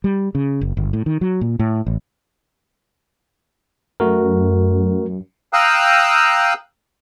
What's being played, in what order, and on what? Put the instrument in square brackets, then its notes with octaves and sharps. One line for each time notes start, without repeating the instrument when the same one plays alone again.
[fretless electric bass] G3
C#3
F#1
G1
A2
D#3
F#3
A#2
A2
A1
[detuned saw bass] F#2 [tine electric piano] A3 F#4 A#4
[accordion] F5 G5 A#5 D#6 E6 F#6